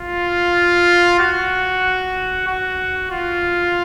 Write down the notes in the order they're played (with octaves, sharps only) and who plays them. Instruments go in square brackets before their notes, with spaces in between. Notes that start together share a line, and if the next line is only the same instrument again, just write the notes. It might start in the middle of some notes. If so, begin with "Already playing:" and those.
Already playing: [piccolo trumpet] F4
F#4
F#4
F4